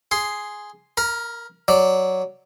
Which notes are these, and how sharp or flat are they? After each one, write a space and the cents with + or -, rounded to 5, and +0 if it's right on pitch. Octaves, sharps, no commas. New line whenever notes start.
G#4 +0 C6 +0
A#4 +0 A#5 +45
F#3 +0 D5 +0